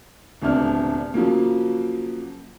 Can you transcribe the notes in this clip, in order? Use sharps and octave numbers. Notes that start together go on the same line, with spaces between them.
D#1 D2 C3 B3 D4 F6
C#3 F3 F#3 A#3